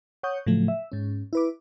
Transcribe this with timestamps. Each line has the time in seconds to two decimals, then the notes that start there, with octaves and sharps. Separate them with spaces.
0.23 C#5 F#5 C#6 D#6 G6
0.47 A2 C#3 F3 F#3 A3
0.68 E5
0.92 G#2 C#4
1.33 E4 B4 D6